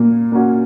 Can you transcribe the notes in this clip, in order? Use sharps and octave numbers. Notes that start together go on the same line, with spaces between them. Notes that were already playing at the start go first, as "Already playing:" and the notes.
Already playing: A#2 A#3
A#3 C#4 F#4